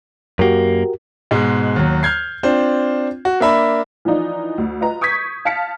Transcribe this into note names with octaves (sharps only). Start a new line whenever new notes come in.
F#2 A#3 F#4 G4 A#4
G#2 B2 G#3
D#2 F#3
F6 G6 G#6 C7
C4 D4 F4 C5
F#4
A#3 D4 E5 B5
E3 F3 D4 D#4 F4
D2
F4 B4 D#5 A#5
C#6 D#6 G6 G#6 B6
F5 A5 F6 B6 C#7